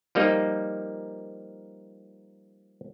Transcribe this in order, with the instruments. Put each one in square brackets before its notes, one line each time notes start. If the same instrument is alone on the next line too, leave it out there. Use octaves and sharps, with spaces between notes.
[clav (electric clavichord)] F3 G3 A#3 D#4